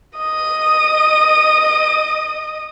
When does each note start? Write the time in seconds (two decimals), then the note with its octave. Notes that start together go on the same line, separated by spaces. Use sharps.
0.18 D#5 D#6